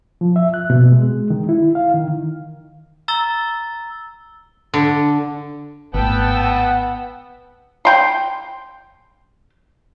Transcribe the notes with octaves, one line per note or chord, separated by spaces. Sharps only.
F3
E5
F#6
B2
G#3
D#3
E4
F5
D#3
A#5 E6 A6 G7
D3
G#1 A2 B3 G5 A5 E6
F#5
G5 C6